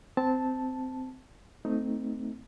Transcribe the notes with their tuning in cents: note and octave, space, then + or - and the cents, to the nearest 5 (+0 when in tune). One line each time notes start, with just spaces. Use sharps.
C4 -15 A5 +0
A3 +5 C4 -20 D#4 +0